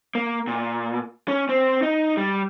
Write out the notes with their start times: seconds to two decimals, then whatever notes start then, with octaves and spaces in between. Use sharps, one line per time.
0.15 A#3
0.47 A#2
1.28 C#4
1.49 C4
1.83 D#4
2.17 G3